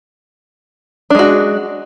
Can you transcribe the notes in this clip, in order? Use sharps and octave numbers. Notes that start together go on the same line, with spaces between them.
G#3 D4 F#4